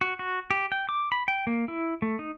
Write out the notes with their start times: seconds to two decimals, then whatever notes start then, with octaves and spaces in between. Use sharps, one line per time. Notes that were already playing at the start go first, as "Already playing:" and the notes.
0.01 F#4
0.19 F#4
0.51 G4
0.72 G5
0.89 D6
1.12 B5
1.28 G5
1.47 A#3
1.68 E4
2.02 A3
2.19 D#4